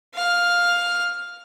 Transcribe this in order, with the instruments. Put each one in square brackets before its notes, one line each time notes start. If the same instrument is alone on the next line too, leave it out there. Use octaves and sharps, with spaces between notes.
[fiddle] F5 F6